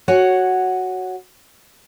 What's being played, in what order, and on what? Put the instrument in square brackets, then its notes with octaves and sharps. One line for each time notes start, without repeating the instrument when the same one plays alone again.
[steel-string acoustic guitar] F#4 C#5 F#5 G#5